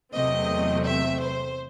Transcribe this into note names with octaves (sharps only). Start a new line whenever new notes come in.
E2 C3 F#3 A3 C4 D#5
E5
C5